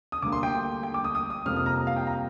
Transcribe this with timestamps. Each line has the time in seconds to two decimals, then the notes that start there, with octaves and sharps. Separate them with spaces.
0.12 D#6
0.22 D2 D3 G3 A#3 D6
0.32 C6
0.43 G5
0.83 G5
0.94 D6
1.04 D#6
1.15 D#6
1.30 D#6
1.45 F2 C3 G3 A#3 F6
1.56 D#6
1.66 A#5
1.87 F5
1.96 G5
2.07 A#5